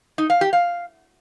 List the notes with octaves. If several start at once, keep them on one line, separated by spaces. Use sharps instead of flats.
D#4
F5
G4
F5